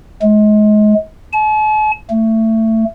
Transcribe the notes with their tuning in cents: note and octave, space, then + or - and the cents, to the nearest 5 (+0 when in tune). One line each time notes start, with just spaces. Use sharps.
G#3 +30
A5 -45
A3 +20